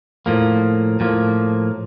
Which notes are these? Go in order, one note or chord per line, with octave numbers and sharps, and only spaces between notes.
A2 F3 A#3
A2 F3 A#3